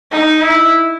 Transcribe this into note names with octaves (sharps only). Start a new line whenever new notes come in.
D#4
E4